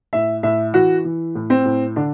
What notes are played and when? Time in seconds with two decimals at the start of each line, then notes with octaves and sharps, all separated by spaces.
0.13 A2 E5
0.43 A2 E5
0.74 E3 F#4
1.05 E3
1.35 A2
1.50 C4
1.65 A2
1.96 D3 D4